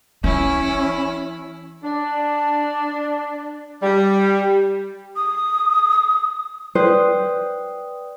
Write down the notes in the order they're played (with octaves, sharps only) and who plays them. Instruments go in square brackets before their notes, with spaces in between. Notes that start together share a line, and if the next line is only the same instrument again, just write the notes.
[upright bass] E3 [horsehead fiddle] C#4 [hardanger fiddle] E4
[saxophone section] D4
G3
[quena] D#6
[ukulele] B4 C5 [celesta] D5 G5 D#6